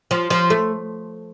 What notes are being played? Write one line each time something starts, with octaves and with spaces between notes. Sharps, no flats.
F3
F3
A3